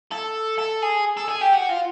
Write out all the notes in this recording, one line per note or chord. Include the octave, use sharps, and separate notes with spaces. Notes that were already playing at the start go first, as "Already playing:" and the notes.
A4
A4
G#4
A4
G#4
G4
F#4
F4